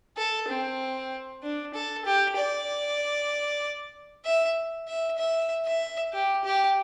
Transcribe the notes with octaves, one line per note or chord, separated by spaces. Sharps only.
A4
C4
D4
A4
G4
D5
E5
E5
E5
E5
G4
G4